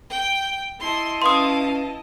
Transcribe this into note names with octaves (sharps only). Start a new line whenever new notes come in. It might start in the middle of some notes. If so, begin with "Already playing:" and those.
G5
E4 D#5 A5 C6
C#4 B4 F5 C6 D#6